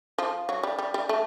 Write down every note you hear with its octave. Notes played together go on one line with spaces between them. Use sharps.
F3
F#3
G3
G3
G3
A3